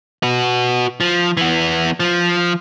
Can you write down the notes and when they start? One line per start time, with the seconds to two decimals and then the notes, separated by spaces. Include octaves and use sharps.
0.23 F#4 B4
1.00 F3
1.37 E3 B3
2.00 F3